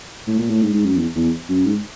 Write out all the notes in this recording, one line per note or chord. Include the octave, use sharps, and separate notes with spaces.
A2
A#2
A2
G#2
G#2
F#2
E2
E2
F#2
G#2